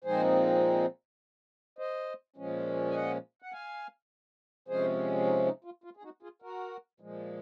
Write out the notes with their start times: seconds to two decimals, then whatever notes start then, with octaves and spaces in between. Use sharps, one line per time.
0.04 A#2 F3 G#3 C4 D#4 G#4 C5
1.79 C5 D#5
2.36 A#2 F3 G#3 C#4
2.90 G#5
2.95 D#5 F#5
3.42 F#5
3.52 F5 G#5
4.68 C3 F3 G#3 C#4 G#4 C5
5.27 D#4
5.46 D#4
5.64 F4
5.84 F4
5.97 G#4
6.04 D#4 F#4
6.22 F4 G#4
6.42 F#4 A#4
7.00 A#2 F3 G#3